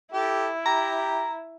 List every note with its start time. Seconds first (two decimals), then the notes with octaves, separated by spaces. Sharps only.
0.13 E4 G4 A4
0.66 G4 A#5